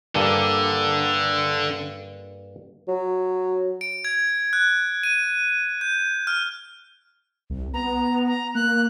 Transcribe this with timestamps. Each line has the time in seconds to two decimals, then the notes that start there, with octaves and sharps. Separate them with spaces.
0.15 G2 D3 A#3 A4
2.88 F#3
3.81 D7
4.05 G#6
4.53 F#6
5.03 D#7
5.81 G6
6.27 F6
7.50 C2
7.74 B3 A#5
8.27 A#5
8.55 A#3 F#6